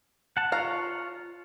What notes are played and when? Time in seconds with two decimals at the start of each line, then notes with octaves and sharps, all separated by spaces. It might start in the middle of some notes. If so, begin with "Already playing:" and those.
0.37 F#5 A5
0.52 F4 C#5 F5 A#5